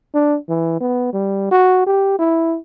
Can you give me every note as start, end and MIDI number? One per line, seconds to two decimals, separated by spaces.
0.14 0.37 62
0.49 0.78 52
0.80 1.11 59
1.13 1.47 55
1.51 1.84 66
1.86 2.18 67
2.19 2.57 64